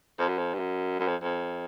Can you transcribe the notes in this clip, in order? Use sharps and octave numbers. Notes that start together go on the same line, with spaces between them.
F2
F#2
F2
G2
F#2
F#2
F2
F2